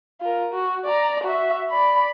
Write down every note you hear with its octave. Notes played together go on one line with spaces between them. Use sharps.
F4 A#4
F#4
D5 A#5
F#4 E5
D5 B5